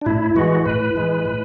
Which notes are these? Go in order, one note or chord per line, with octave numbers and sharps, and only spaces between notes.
D4
A2 E4
E3 G#3 F#4
A2 B4
E3 G#3
A2